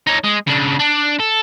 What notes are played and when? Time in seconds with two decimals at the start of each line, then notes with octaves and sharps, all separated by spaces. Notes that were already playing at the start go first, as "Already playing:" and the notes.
0.07 D#4 C#5
0.24 G#3
0.47 C#3 D4
0.79 D4
1.20 A4